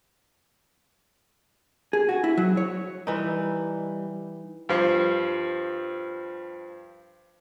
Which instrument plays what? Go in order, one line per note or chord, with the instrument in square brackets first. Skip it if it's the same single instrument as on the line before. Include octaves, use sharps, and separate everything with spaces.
[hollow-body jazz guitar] G#4
F#4
E4
F#3
C#5
[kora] E3 D#4 [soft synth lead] G3
[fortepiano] G2 F3